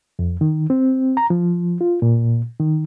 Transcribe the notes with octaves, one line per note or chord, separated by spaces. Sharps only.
F2
D#3
C4
A#5
F3
F4
A#2
D#3